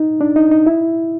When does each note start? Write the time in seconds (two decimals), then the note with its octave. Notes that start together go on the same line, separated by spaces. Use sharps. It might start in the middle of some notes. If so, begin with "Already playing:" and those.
Already playing: D#4
0.21 D4
0.36 D#4
0.51 D#4
0.66 E4